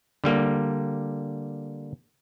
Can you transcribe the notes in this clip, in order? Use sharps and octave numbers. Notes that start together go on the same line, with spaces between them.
D3 G3 A#3